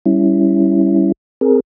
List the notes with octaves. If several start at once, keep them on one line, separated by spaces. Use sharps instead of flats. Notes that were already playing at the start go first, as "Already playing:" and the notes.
G3 C#4 E4
C4 G#4 A#4